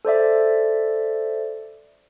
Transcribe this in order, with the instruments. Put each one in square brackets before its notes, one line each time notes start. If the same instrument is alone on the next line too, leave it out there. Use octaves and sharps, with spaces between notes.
[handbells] A4 C5 D5 E5